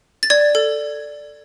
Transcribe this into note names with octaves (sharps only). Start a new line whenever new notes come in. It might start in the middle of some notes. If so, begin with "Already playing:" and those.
A6
D5 G#6
A4